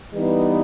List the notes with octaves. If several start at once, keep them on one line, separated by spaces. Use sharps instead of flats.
E3 G3 B3 D#4